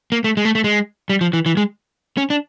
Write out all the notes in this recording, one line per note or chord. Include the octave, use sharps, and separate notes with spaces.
A#3
A3
G#3
A3
A3
G#3
G3
F3
E3
E3
G#3
C#4
D4